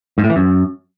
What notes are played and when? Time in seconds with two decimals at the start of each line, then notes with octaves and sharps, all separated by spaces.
0.18 G#2
0.24 A2
0.30 E3
0.36 F#2